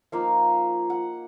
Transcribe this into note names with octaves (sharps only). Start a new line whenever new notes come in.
F3 A#3 D#4 F5
F#5